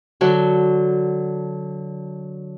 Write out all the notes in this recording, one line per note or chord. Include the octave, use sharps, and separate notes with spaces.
D3 F#3 F#4